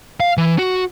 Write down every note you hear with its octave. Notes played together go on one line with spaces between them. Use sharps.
F5
E3
F#4